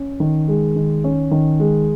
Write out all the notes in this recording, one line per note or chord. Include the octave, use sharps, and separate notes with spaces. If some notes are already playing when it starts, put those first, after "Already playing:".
Already playing: C#4
D#3
G#3
D#3
C#4
D#3
G#3